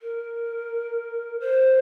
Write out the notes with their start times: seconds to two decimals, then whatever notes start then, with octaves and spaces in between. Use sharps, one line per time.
0.02 A#4
1.40 C5